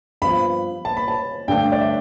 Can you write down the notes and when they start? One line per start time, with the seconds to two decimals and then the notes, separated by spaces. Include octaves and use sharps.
0.22 G2 F3 B3 B5
0.85 A5
0.97 B5
1.08 A5
1.48 G2 D3 A3 D4 G5
1.72 D5
1.80 E5